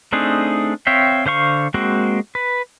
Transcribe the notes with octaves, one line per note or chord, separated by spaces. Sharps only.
A3 C4 D4 D#4 G#4
C4 C#5 E5 F5 G5
D3 C5 F5 C#6
G#3 A#3 C4 F#4
B4